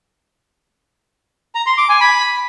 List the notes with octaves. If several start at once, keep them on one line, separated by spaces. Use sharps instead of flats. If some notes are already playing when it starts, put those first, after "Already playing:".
A#5
C6
D6
G#5
B5